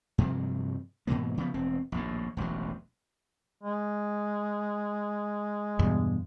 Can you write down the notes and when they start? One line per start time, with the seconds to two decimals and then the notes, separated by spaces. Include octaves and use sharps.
0.18 G2 C3 F3 F#3
1.07 G#2 B2 E3 A#3
1.37 C#3 F3 B3
1.54 E1 C4
1.92 A#1 D#2 A2
2.37 E1 A1 D#2 F#3
3.63 G#3
5.79 E2 G2 B2